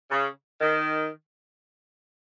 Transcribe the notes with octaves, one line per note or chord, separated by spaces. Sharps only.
C#3
D#3